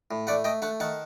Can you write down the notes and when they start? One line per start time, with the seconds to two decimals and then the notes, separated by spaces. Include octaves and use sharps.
0.11 A2
0.27 A3 D5 F#5
0.44 A3 D#5 G5
0.62 A3 F#5 A5
0.80 D#3 F#5 A5